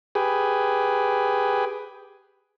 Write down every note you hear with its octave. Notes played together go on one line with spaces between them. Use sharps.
G4 G#4 B4